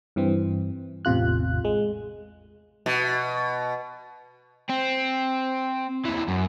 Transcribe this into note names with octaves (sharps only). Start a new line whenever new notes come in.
G2 E3 C4
A1 E2 C3 F4 F#6
G#3
B2
C4
D#2 E3
F#2